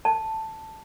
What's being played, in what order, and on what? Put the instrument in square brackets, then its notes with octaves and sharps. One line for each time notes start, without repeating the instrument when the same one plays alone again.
[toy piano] A5